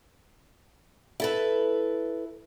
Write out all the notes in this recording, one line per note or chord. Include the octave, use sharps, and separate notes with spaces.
E4 A4 B4